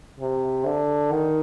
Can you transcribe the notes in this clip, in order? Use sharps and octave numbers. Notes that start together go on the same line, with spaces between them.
C3
D3
D#3